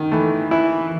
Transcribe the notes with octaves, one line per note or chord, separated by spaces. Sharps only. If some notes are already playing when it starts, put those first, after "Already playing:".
Already playing: D#3
E3 A3
E3 E4